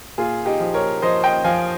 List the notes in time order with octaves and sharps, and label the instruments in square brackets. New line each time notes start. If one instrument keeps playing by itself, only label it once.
[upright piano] A#2 F4 G#4
D#4 G4
F3
A#4 C#5
F3 C5 D#5
D#5 G5
F3 F5 G#5